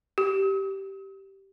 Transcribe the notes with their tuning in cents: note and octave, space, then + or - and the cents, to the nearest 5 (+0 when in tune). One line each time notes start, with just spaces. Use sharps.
G4 -10 D#6 +45